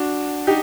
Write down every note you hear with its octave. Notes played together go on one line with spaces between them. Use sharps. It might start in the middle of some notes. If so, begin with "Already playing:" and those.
Already playing: D4 F#4
D#4 G4